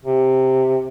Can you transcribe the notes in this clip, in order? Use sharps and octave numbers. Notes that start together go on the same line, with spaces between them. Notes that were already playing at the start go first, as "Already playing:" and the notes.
C3